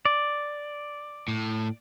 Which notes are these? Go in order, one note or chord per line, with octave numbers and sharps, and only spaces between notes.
D5
A2